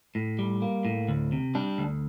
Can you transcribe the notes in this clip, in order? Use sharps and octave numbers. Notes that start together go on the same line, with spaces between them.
A2
G3
A#3
A2
D2
C3
G3 D4
D2